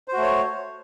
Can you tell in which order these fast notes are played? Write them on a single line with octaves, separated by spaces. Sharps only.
C5 F#4 A3 C#5